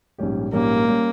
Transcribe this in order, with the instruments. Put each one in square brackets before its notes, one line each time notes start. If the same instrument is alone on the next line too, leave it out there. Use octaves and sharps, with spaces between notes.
[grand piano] A#1 G#2 G3 C#4 G4
[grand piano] A#1 G#2 G3 C#4 G4 [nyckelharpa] A#3
[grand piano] G3 C#4 G4